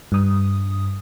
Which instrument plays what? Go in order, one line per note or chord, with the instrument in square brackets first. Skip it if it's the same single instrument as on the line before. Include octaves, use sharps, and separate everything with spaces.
[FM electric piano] G2 D#6